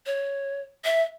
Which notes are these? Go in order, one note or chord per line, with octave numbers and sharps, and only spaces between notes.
C#5
E5